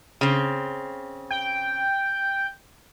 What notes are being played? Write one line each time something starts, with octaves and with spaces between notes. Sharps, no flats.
C#3 C4
G5